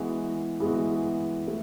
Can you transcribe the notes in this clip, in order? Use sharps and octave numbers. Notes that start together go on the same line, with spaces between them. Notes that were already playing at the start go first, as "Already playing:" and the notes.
Already playing: E3 G#3 B3 F#4
E3 G#3 B3 F#4
E3 A3